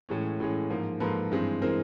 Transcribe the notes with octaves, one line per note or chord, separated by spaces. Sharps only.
A2 E3 G#3 C#4
A2 E3 G#3 C#4
G#2 F3 A#3
G#2 F3 A#3 A4 B4
G2 E3 G#3 C4
E3 G#3 C4 A#4 C5